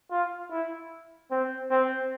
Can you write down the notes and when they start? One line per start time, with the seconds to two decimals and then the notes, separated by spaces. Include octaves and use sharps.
0.11 F4
0.51 E4
1.31 C4
1.71 C4